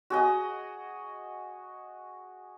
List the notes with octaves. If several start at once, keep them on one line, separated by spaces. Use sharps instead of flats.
F#4 G#4 D#5